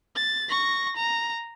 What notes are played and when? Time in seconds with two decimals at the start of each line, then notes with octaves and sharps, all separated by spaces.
0.16 A6
0.49 C#6 A#6
0.96 A#5